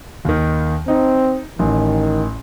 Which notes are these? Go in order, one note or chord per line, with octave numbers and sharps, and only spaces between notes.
D#2 D#3
C4 D#4
A1 D#3